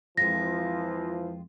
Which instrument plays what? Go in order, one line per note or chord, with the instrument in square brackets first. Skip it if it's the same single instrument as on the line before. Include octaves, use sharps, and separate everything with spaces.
[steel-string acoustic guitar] F2 G#3 F4 [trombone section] E3 F3 [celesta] A#6